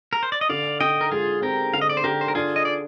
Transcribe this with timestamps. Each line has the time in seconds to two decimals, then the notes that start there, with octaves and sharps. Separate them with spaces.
0.13 A#4
0.23 C5
0.32 D5
0.41 D#5
0.49 D3 D5 F5
0.80 D3 D#5 G5
1.01 A#4
1.12 G#3 F4 G#4
1.42 C4 G4 A#4
1.74 D3 F5
1.81 D#5
1.90 D5
1.97 C5
2.04 D3 G4 A#4
2.21 C5
2.28 A#4
2.35 D4 F4 G#4
2.56 D#5
2.65 D5